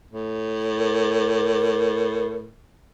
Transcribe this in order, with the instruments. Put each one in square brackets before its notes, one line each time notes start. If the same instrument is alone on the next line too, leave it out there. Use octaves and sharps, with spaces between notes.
[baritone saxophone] A2
[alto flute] A#4